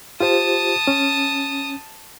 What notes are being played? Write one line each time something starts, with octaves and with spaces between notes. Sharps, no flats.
F4 G4 C5 A5 D#6
C#4